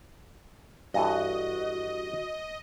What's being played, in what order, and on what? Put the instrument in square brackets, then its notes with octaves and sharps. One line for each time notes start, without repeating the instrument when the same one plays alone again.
[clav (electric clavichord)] G2 E3 A4 [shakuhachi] F#4 [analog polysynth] D#5